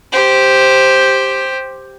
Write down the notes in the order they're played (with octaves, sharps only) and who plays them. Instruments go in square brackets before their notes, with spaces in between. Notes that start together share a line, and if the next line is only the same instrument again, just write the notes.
[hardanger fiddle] G4 C5